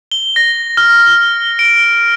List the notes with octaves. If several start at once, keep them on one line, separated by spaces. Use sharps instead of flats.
G7
A#6
F6
D7